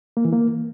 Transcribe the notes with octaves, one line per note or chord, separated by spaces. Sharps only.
A#3
E3
A#3